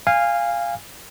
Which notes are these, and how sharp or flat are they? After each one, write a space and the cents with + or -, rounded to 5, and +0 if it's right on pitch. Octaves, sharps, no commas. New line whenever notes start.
F5 -5 G#5 -25